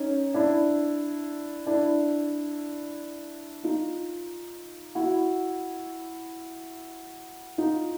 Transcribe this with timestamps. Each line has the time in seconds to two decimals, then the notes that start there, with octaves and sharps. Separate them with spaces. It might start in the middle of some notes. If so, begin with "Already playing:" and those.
Already playing: C#4 D#4
0.34 D4 E4
1.66 D4 E4
3.64 D#4 F4
4.95 E4 F#4
7.58 D#4 F4